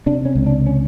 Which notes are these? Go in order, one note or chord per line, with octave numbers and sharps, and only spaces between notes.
C3 D4
C#4
C#2
D4
C#4